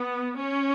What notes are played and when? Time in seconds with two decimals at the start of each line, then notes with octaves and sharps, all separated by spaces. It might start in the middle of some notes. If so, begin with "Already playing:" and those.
Already playing: B3
0.36 C#4